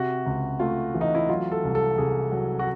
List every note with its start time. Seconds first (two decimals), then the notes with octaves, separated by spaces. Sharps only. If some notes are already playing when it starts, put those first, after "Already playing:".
Already playing: C3 F#4
0.26 C#2
0.60 A3 F4
0.94 E3
1.01 D#4
1.15 E4
1.29 F#3 F4
1.52 A4
1.64 C2
1.75 A4
1.98 C2 G#4
2.32 F#3
2.59 F#4